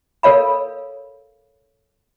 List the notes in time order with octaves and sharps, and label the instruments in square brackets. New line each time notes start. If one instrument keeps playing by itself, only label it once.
[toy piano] A4 A#4 C#5 F5 B5